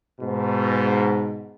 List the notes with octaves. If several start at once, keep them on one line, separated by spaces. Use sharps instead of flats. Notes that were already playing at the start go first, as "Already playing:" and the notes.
G#2 B2